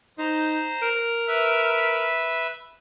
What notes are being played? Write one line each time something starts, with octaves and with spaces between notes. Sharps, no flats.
D#4 C5 A#5
A#4
B4 E5